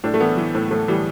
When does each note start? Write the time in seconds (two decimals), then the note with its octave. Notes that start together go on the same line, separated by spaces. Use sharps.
0.04 A2 D4
0.14 A3
0.20 E3 B3
0.37 E3
0.55 A2
0.71 A2 A3
0.88 E3 G3